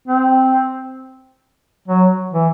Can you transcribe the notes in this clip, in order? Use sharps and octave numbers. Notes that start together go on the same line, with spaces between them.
C4
F#3
E3